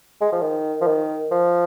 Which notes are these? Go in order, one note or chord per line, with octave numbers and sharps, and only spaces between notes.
G#3
F3
D#3
F3
D#3
F3